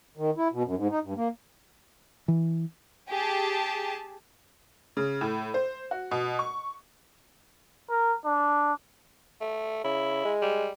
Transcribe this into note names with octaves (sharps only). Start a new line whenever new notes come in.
D#3
E4
B2
F#2
G#2
D#4
G2
A#3
E3
G4 G#4 A5
C#3
A2
C5
F#4
B2
C#6
A#4
D4
A3
C#3 E4
G#3
G3